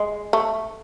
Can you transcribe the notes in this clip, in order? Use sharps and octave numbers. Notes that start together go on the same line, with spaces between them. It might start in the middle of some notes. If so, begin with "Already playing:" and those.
Already playing: G#3
A3